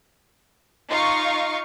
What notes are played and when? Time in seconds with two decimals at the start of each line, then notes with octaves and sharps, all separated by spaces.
0.89 D#4 F4 F5 C#6